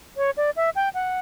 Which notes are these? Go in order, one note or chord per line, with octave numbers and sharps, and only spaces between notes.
C#5
D5
E5
G5
F#5